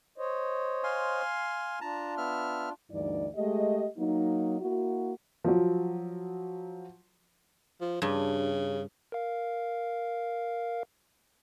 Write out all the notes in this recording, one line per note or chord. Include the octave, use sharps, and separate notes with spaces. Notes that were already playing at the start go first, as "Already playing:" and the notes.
C5 C#5 D#5
F5 G#5 C6
D4 F4 A5 A#5
B3 E5 F6
D2 G2 E3 D#4 D5
G#3 A3 G4 D#5
F#3 A#3 D#4
A#3 E4 F#4
F3 F#3
F3
G2 C#3
A#4 F5